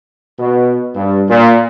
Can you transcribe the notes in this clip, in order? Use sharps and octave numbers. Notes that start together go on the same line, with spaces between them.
B2
G2
A#2